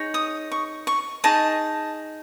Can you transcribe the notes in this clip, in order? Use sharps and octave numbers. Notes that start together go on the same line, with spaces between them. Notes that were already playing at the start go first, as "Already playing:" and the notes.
Already playing: D#4 G#4 C#5
D#6
C#6
C#6
D#4 G#4 D#5 A5